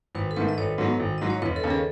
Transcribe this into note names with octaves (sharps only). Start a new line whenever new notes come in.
G#1 B4
A4
G#2 D#3 A3 B4
D#5
G#1 C#5
G#2 F#3 B3
G#1
G#2 F#3 D#5
C#5
E1 B4
A4
D#2 C#3
G#4